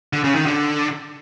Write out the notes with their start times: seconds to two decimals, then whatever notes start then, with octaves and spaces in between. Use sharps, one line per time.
0.13 D3
0.24 C#3
0.35 D#3
0.46 D3